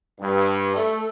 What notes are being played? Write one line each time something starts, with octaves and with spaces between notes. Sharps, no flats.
G2
A3 A4